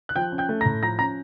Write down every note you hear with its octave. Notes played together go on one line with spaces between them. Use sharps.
F#6
F3 G5 G6
C#4
G5 G6
A3
A#5 A#6
A2
F3 A#5 A#6
C#4 A#5 A#6